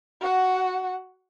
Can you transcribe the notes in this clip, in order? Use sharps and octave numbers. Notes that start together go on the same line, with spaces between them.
F#4 F#5